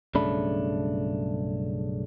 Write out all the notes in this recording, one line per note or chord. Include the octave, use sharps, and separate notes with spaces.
B1 G2 C#3 A3 D4 B5